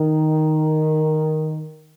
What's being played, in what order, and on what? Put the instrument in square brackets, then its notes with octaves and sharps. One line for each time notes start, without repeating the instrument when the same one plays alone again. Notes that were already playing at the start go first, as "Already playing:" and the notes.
Already playing: [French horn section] D#3